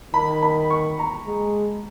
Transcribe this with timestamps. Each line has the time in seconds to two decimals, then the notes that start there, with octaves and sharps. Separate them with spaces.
0.14 D#3 B5
0.43 B5
0.70 C#6
0.99 A#5
1.26 G#3